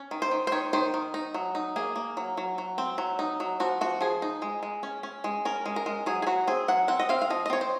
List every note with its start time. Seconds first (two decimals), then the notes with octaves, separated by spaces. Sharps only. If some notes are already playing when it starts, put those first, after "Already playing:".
Already playing: C#4
0.11 D#3
0.22 C5
0.31 D#3
0.47 C5
0.52 D#3 C#5
0.73 D#3 C5
0.94 D#3
1.14 D#4
1.34 F#3
1.55 D#4
1.76 A#3 G#4
1.96 A#3
2.17 F#3
2.38 F#3
2.58 F#3
2.78 C4
2.98 F#3
3.19 D#4
3.40 F#3
3.60 F3 F#4
3.81 F3 F#4
4.01 F3 G#4
4.22 D#4
4.42 G#3
4.63 G#3
4.83 C#4
5.03 C#4
5.24 G#3
5.45 C#4 A#4
5.66 G#3
5.76 A#4
5.86 G#3
6.06 F#3 G#4
6.22 G#4
6.27 F#3 F#4
6.47 C4 G#4
6.68 F#3 F#5
6.88 C4 F#5
7.00 D#5
7.09 C4 F5
7.22 F5
7.30 F3 D#5
7.46 D#5
7.50 C4 C#5
7.61 C5